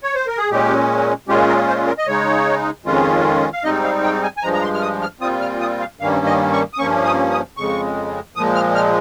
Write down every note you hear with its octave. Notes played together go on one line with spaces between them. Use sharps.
C#5
C5
A#4
G#4
A#2 G#3 C#4 G4
A#2 G#3 C#4 F4 G4
A#4
C5
A#4
D#5
C#3 G#3 D#4 C#5
F2 D#3 G#3 C#4 F4
F5
G#2 G3 C4 D#4 D#5
F5
G5
G#5
G#5
G2 F3 G#3 A#5
A#5
C6
F6
D#6
F6
A#2 G3 C4 F4 D#6
F6
D#6
F5
G2 D#3 G3 A#3 C#4 F5
D#5
C#6
D#6
G2 F3 A#3 C#4 C#6
D#6
D#6
F2 C#3 G#3 C#6
A#2 F3 G#3 D#6
F6
F6